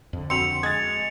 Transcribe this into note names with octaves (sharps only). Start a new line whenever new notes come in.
F2 D3
C4 F#4 B5 C6 C#7 F7
G#3 G#4 G#6 A6